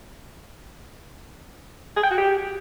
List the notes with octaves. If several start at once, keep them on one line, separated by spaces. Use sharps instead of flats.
G#4
G5
F#4
G4